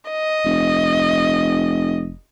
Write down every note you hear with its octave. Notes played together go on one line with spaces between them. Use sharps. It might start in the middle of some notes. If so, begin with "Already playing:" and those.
D#5
F1